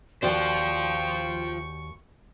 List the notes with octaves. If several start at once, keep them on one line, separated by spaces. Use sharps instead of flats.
D#2 F4 F#4 C5 D5 G5 C#6